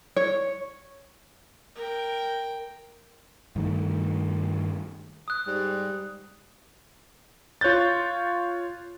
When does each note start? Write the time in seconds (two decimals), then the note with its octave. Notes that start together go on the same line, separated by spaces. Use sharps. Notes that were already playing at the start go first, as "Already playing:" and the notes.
0.16 C#5
1.75 A#4 G5
3.56 G2 D#3 A3
5.28 D#6 F#6
5.47 G#2 G3
7.61 F4 C#5 F#6 G6 A6